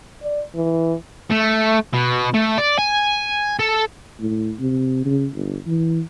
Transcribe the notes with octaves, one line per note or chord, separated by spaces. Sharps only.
D5
E3
A3
B2
A3
D5
G#5
A4
A2
C3
C#3
G1
E3